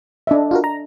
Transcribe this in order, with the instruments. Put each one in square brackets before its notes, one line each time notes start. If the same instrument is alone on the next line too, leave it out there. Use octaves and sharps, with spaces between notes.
[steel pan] D4 D#5 E5
[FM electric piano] F4 F#4 A#4
A#5